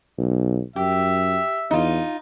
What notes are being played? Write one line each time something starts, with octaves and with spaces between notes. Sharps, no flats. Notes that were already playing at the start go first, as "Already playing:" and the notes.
B1
F#2 G4 E5
E2 D#4 F4